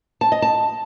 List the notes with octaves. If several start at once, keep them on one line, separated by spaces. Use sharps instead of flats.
A5
D#5
A5